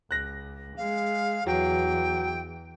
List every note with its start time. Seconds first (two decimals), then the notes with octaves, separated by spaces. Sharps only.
0.11 C#2 F#6 A#6
0.77 G#3 F5
1.47 E2 F#3 G5